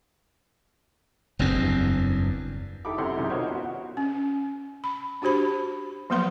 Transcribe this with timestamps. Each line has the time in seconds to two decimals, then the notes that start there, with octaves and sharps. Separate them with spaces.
1.39 F#1 E2 G2 C4
2.85 D#3 E4 G4 A4 B5 D6
2.98 F#2 C3 E4 A4 F#5 C6
3.17 B1 F#2 C3 G#3
3.30 D#4 F4 F#4 A#4 C5 C#5
3.51 B3 F#4
3.97 C#4
4.84 B5
5.22 D4 F#4 G4 C5 B5
6.10 F3 F#3 A#3 B3 B4 C6